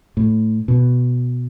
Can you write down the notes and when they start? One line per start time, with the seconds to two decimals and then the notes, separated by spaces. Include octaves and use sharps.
0.17 A2
0.68 B2